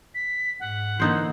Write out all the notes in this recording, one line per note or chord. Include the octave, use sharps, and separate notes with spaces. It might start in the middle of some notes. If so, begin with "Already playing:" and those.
B6
G#2 F#5
D3 E3 A#3 D#4 C5